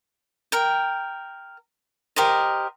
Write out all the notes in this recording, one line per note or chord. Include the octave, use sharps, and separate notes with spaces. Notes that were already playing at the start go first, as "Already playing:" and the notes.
A#4 G5
G4 A#4 C5 D#5